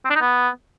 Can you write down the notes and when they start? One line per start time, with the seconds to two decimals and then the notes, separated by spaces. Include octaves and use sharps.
0.05 C4
0.10 D4
0.16 D#4
0.21 B3